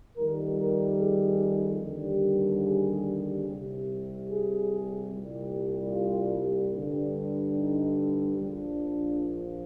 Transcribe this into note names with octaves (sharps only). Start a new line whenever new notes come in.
F2 D#3 G3 A#4
A#4
G#4
D#2 D3 G3
G#4
C2 C3 G3
G#4
C2 A#2 G3
F4
G2 D3 G3
D#4
A#1 A#2 F3 D4